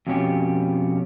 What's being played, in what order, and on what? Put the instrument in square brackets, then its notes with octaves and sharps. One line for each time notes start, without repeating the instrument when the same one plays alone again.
[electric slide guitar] F2 B2 C#4 G4